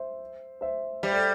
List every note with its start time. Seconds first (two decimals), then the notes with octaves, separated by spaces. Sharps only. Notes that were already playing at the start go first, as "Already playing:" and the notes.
Already playing: C5 E5
0.61 C5 E5
1.03 G3 C5 E5
1.12 A4 D5